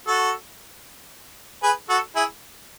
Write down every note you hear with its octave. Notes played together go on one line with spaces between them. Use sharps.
F#4 A4
G#4 B4
F#4 A4
E4 G#4